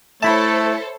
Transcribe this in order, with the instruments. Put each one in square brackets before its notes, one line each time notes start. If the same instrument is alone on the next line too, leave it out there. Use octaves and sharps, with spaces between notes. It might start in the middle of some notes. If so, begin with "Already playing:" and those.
[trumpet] A3 [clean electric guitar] E4 A5 [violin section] A4 C5 C#5 [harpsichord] E5 B5